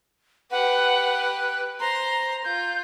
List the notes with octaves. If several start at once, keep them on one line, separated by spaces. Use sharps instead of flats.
G4 B4 F#5
F#6
C5 A#5 C6
F4 G6